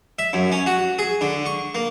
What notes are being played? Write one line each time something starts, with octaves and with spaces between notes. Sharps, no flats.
E5
F#2
C#4
F#4
G#4
D3
C#6
A#3